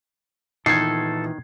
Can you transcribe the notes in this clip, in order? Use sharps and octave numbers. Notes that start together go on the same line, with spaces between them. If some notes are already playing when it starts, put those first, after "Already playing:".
A#2 D#3 E3 B3 D#4 A4 G#6 C7